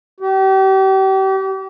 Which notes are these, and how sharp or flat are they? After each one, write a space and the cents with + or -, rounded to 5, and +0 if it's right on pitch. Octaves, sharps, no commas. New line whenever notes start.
G4 -35